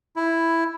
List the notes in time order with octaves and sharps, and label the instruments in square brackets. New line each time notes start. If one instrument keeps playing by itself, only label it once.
[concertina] E4